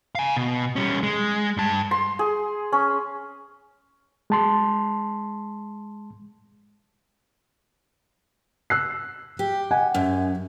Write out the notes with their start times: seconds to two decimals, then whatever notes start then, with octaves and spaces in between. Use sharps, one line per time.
0.15 F5 G#5
0.37 B2
0.76 G3 C#4
1.03 G#3
1.57 G2 A5
1.91 C6
2.19 G#4
2.72 C#4
4.30 G#3 A5 C6
8.70 E6 F#6 C7
9.39 G4
9.71 D#5 F#5 G#5
9.94 F#2